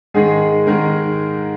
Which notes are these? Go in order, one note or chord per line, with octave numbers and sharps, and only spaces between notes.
G#2 D#3 G#3 G#4
G#2 D#3 G#3 A#4